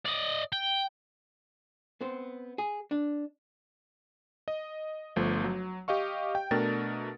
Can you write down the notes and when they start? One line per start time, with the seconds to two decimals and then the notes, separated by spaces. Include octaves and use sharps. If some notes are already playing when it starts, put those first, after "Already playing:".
0.05 D5 D#5
0.53 G5
2.01 B3 C4 C5
2.58 G#4
2.91 D4
4.48 D#5
5.16 G1 F3 A3 B3
5.44 F#3
5.88 G4 D#5 F5 C#6
6.35 G5
6.51 B2 A3 D4 A#4 A6